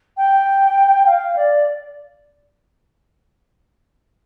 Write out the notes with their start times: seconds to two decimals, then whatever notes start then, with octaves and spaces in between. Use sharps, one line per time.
0.17 G5
1.06 F5
1.36 D5